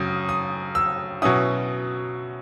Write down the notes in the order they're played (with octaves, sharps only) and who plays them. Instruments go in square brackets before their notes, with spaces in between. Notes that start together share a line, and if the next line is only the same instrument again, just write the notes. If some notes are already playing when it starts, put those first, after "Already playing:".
Already playing: [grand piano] F#2 C#3 D#6
D#6
E6
B2 F#3 C#4 E4 D#6